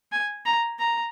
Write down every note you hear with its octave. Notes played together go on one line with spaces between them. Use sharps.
G#5
A#5
A#5